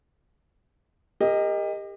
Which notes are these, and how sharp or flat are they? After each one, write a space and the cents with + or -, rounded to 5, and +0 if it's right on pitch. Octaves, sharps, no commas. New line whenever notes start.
G4 +30 A#4 -20 D#5 +0